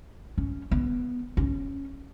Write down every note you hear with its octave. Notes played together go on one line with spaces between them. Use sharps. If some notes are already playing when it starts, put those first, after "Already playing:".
C#4
B3
C#4